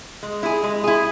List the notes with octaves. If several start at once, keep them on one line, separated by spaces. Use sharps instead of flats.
G#3
E4 G#4
G#3
E4 G#4